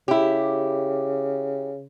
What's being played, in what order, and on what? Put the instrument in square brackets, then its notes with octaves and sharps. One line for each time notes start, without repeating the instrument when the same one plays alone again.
[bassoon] C#3 [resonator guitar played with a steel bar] E4 G4